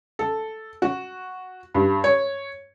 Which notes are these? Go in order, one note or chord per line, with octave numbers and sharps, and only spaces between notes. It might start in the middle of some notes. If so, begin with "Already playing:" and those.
A4
F#4
G2
C#5